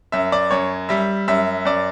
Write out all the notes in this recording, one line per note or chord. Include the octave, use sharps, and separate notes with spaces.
F#2 E5
D5
F#2 C#5
G3 E5
F#2 E5
F#2 D5